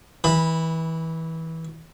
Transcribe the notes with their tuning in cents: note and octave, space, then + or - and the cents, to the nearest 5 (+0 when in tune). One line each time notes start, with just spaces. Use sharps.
E3 -25 B5 +0